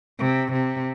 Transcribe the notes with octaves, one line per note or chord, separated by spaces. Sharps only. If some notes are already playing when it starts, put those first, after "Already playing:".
C3
C3